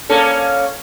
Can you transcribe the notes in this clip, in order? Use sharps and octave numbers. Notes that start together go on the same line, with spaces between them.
A#3 C#4 A4